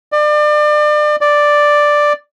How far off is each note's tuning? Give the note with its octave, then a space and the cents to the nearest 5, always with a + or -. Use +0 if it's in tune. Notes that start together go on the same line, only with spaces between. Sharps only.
D5 +35
D5 +5